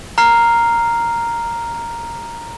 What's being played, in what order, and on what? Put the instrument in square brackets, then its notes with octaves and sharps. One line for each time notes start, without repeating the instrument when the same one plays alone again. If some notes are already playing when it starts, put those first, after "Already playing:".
[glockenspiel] A#5 F6 C7